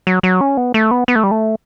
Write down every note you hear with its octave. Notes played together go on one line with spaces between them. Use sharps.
F#3
F#3
C#4
B3
A3
B3
B3
A3
G3
A3